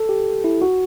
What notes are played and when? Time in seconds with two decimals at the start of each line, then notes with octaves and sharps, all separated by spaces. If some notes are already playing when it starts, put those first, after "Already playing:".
Already playing: A4
0.09 G4
0.44 E4
0.62 F#4